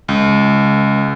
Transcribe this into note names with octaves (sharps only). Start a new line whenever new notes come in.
C#2